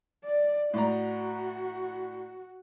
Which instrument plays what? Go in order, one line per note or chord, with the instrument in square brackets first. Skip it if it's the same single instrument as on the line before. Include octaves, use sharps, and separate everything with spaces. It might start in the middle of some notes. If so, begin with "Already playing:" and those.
[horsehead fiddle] D5
[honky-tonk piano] A2 D5 A#5 [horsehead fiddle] F#4